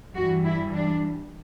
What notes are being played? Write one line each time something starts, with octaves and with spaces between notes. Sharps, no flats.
G2 E3 G3 F#4
E4
D4